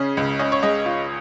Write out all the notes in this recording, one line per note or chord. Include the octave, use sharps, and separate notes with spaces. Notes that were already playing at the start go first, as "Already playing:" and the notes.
Already playing: C#3 C#4 D#5
C#2
C#4 D#5
C#5
G#3 D#5
F4